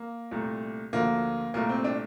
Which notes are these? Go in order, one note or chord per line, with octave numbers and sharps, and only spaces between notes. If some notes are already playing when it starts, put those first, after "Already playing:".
Already playing: A#3
C2 A#2 A3
D2 D3 F3 A#3
C2 A#2 A3 A#3
C4
D4